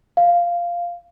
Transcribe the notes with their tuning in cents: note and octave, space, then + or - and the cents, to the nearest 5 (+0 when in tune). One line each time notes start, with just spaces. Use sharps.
F5 -10